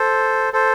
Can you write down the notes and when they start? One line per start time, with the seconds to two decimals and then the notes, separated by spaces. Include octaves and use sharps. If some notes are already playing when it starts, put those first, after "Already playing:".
Already playing: A4 C5
0.53 A4 C5